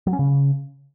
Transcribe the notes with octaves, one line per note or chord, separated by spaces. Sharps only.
F#3
C#4
C#3